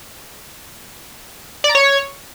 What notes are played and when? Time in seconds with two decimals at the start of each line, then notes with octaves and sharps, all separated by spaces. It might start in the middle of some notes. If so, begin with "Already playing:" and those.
1.64 D5
1.69 A#5
1.75 C#5